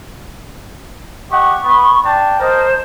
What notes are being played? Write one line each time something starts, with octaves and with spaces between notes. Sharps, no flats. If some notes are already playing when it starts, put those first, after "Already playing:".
G4 D#5 F#5 C#6
B3
D4 G5 A5
A#4 C5 D#5 A5